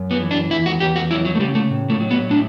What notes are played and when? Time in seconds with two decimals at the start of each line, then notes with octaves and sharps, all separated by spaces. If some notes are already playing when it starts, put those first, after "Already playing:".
Already playing: F#2
0.11 B3
0.21 E3
0.31 D4
0.50 E2 E4
0.66 F#4
0.80 E2 G4
0.96 F#4
1.11 F#3 E4
1.25 F#3
1.35 A3
1.40 C#3 G3
1.55 A3
1.71 A2
1.90 A3
2.00 F#3
2.11 B3
2.30 A2 D4